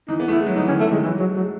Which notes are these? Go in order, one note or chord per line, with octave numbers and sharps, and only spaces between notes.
E3 D#4
B3
A3 E4
G#3
F#3
E3 D#4
D#3 C#4
C#3 A3
D#3 G#3
E3 F#3
F#3 G#3
A3
F#3
G#3